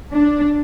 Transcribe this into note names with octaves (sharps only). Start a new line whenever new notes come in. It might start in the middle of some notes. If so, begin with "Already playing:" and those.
D4